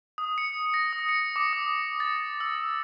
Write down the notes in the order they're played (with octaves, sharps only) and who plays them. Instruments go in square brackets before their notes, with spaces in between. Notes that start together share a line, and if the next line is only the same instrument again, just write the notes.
[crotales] D#6
C#7
A#6
D#6
C#7
D6
D#6
A6
E6